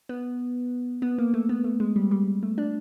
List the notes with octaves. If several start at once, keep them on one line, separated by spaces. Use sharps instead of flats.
B3
B3
A#3
A3
B3
A3
G#3
G3
G3
A3
D4